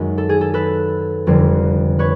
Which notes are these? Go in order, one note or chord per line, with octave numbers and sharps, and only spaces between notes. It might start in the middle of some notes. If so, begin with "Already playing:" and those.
Already playing: F#2 D#3 G#3
A4
G#4
A4
A4 B4
F1 F2 D3 G3
B4 C#5